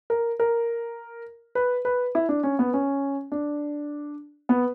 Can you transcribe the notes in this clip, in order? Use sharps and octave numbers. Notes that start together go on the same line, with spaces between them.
A#4
A#4
B4
B4
E4
D4
C#4
B3
C#4
D4
B3